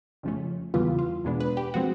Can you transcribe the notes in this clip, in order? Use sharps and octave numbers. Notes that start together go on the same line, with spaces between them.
F2 C#3 F3 A3 C#4
E2 C#3 E3 G3 B3 F4
F4
E2 B2 G#3 B3 D4
B4
G4
F3 G#3 C4 F#4